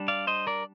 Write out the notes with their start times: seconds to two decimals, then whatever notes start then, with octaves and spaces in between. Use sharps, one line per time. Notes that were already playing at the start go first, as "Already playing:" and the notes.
Already playing: G3 D4
0.08 D5 F5
0.27 C5 D#5
0.47 A#4 D5